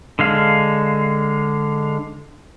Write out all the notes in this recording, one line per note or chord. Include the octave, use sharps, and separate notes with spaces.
D3 G#3 F5